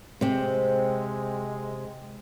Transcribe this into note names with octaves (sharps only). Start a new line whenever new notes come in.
C3 G#3 C4